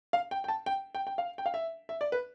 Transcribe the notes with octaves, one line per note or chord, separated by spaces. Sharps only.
F5
G5
G5
A5
G5
G5
G5
F5
G5
F5
E5
E5
D5
B4